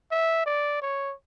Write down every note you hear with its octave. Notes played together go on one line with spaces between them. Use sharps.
E5
D5
C#5